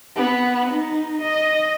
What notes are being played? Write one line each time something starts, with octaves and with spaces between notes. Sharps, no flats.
B3
D#4
D#5